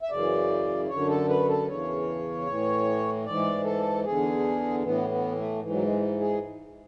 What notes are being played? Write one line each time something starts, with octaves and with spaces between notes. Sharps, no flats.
E5
F#2 C#3 E3 D5
F#2 D3 C#5
A4
B4
A4
E2 C#3 E3 C#5
A2 E3
G#2 E3 D5
A4
E2 D3 G#4
A2 E3 B3
B3
A3
G#2 E3
F#3
G#3
G#4